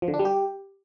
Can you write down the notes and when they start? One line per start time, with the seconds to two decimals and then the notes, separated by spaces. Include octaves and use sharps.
0.02 F3
0.08 D3
0.14 D4
0.19 G3
0.25 G4